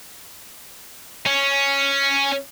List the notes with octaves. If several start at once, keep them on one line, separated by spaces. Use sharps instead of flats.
C#4